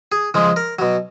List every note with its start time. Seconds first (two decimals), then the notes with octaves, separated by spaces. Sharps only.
0.12 G#4
0.34 C#3 F3 G#3
0.56 A#4
0.79 B2 F#3